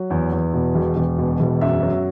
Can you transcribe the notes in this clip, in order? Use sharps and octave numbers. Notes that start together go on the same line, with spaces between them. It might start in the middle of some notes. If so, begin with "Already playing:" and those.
Already playing: F#3
E2
E2
B2
E1
E1
B2
E1
F#2 E5
F#3